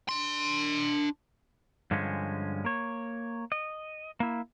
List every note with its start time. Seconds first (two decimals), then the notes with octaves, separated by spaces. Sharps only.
0.09 D4 C6
1.91 G2 D3 F3 G#3 C#4
2.65 A#3 C#5
3.52 D#5
4.20 A#3 E4